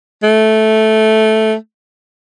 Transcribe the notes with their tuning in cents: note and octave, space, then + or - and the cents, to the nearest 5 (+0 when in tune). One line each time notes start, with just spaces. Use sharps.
A3 -10